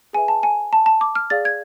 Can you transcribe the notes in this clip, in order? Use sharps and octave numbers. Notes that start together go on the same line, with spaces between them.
G#4 B4 E5 G#5
A5
G#5
A5
A5
D6
F6
G#4 D5 F5 A6
G#6